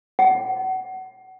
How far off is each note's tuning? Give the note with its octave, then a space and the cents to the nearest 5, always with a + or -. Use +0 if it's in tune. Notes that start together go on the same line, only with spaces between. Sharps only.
F#5 +25